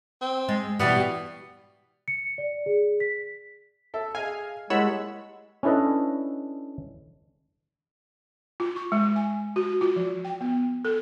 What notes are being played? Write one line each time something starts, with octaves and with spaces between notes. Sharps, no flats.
C4
G#3
B2 E3 G3 B3
C#7
D5
G#4
B6
A4 E5
G#4 D#5 F5 G#5
G#3 A#3 E4 G4 C#5 F#5 B5 E6
C#4 D4 E4 A4 B4 D#5
F4
C#6
G#3
G#5
F#4
F4
F3
G5
B3
A4